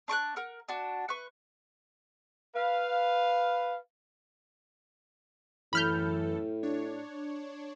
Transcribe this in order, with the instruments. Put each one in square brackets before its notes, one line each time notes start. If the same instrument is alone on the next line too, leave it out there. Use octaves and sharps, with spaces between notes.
[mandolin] D4 C#6 D6 F#6
A#4 F#5
D4 F#4
B4 C#6
[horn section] B4 F5
[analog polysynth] F#2 E3 A4 [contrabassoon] A2 [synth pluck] B5 F6 G6
[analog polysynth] D4 C#5